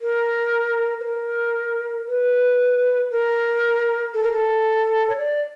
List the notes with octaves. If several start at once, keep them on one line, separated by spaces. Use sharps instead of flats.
A#4
B4
A#4
B4
A#4
A4
A#4
A4
C#5
D5